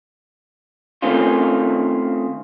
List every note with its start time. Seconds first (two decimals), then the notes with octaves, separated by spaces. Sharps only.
1.02 D#3 A3 C4 C#4 F4